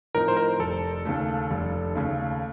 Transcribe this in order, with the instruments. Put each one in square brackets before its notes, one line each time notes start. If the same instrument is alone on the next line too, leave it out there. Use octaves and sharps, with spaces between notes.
[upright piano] A2 F3 C4 D#4 [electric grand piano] A#4
[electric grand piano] C5
A#4
[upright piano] F1 [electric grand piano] A4
[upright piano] D#2 C#3 A3
F1
D#2 C#3 A3